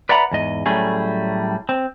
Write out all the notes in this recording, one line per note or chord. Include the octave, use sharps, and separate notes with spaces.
B4 D5 E5 F#5 A#5 B5
E2 G#2 D#5
A2 F#3 G3 A3 C#4 G#4
C4